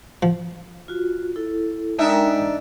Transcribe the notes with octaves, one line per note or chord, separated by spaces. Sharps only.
F3
F4 F#4
E4 A4
G#3 D4 D#4 A#4 E5 G5